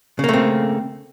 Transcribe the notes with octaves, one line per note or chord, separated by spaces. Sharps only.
C#3 A3 A#3 C4